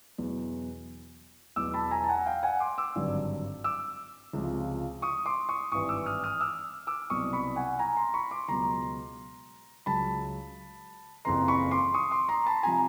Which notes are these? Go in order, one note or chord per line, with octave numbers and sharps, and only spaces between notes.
E2 B2 F#3
E1 E2 B2 F#3 D6 E6
A5 B5
G#5 A#5
A5
F#5 G#5
F5 G5
F#5 G#5
C6 D6
D6 E6
G#1 G2 D3 F#3
D6 E6
C#2 C3 F3
C#6 D#6
C6 D6
C#6 D#6
G#1 G2 E3 C#6 D#6
D6 E6
D#6 F6
D#6 F6
D6 E6
D6 E6
C2 B2 F#3 C#6 D#6
B5 C#6
F#5 G#5
G#5 A#5
A#5 C6
B5 C#6
C6 D6
C#2 B2 F#3 A#5 C6
C#2 C#3 F#3 A5 B5
F#1 F2 C#3 E3 A#5 C6
B5 C#6
C6 D6
C#6 D#6
C6 D6
A#5 C6
A5 B5
C3 F3 G#5 A#5